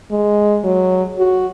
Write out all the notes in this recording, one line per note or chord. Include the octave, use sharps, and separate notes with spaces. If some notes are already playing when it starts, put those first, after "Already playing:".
G#3
F#3
F#4